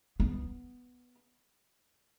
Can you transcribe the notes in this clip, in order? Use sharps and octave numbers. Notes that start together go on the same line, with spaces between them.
B3